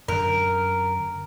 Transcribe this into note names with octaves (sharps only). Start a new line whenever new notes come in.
F#2 D3 A#4